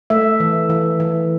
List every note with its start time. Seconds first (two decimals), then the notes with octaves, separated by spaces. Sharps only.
0.10 A3 E5
0.40 E3
0.70 E3
1.00 E3